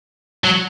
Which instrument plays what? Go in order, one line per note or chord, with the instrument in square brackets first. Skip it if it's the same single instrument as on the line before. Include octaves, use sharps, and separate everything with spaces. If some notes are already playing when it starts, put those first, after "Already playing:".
[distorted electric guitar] F#3